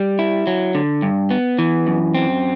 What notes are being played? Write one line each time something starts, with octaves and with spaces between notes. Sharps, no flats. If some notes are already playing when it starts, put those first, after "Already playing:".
Already playing: G3
E4
F#3
D3
G2
B3
E3
F#2
C4